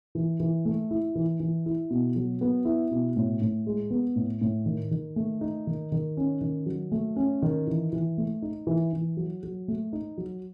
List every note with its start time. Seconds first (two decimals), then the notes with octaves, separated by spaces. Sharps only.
0.15 E3
0.40 E3
0.65 A3
0.91 E4
1.15 E3
1.40 E3
1.66 E4
1.90 B2
2.16 F#3
2.41 B3
2.65 E4
2.91 B2
3.16 A2
3.42 A2
3.67 G#3
3.90 B3
4.16 A2
4.41 A2
4.66 D#3
4.91 D#3
5.16 A3
5.41 D#4
5.67 D#3
5.92 D#3
6.17 C#4
6.41 D#3
6.66 F#3
6.92 A3
7.16 C#4
7.42 D#3
7.67 E3
7.92 E3
8.18 A3
8.42 D#4
8.67 E3
8.93 E3
9.17 F#3
9.43 F#3
9.68 A3
9.93 D#4
10.18 F#3